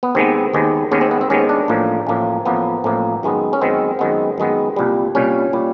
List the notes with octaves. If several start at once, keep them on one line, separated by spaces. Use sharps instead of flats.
B3
D#2 D#3 G#3 B3 C4
D#2 D#3 G#3 B3
D#2 D#3 G#3 B3 C#4
C4
B3
C4
D#2 D#3 G#3 B3 C#4
D4
A1 A2 F3 A#3
A1 A2 F3 A#3
A1 A2 F3 A#3 B3
A1 A2 F3 A#3
F#2 D#3 G#3 B3
C#4
F#2 D#3 G#3 B3 C4
F#2 D#3 G#3 B3
F#2 D#3 G#3 B3
C2 A#2 G3
C2 A#2 G3 C#4
A#2 G3